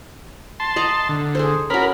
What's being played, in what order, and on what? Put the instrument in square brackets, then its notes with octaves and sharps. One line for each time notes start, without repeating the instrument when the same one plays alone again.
[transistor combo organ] A5 C6
[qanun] D#5 F#5 A#5
[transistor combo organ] D3
[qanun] G#4 A4 C5
[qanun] C#4 F#4 [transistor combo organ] A#4 B5